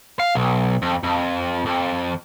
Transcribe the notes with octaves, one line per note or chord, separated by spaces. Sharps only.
F5
B1
F2
F2
F2